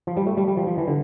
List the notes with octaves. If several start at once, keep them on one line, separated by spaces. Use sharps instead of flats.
F3
G3
A3
G3
G3
F3
F3
E3
D3